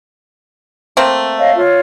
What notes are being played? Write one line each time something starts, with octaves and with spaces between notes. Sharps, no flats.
A3 A#3 C4
C#5 D#5 F5
F4 C#5